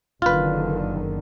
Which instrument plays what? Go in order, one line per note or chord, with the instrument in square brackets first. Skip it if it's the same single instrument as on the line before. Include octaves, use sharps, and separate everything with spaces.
[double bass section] F#1 D3 D#3 [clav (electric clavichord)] F4 B4